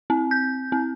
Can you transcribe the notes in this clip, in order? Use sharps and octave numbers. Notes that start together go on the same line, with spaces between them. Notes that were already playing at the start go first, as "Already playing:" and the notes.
C4
G6
C4